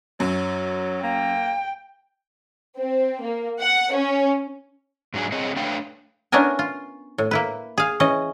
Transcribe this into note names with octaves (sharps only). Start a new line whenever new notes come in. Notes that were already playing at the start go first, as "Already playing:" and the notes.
F#2 F#3
A#3 G5
C4
A#3
F#5
C#4
G#2 F#3 D4 G#4
C4 G#4 C#5 D#5
A3 D4 B4 C#5 F5 G5
B3 C#4 D4 E4 A#4 G#5
F4
A2
A#3 E4 B4
G#4 F5
E3 C#4 D#5